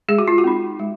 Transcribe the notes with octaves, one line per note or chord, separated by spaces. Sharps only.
G#3 G#4
F#4
F4
F#4
C4 D#4
G#3